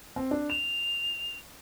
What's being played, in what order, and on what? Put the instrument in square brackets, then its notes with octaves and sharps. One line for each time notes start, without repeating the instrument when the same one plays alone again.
[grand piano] C4
D4
[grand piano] E7 [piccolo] F7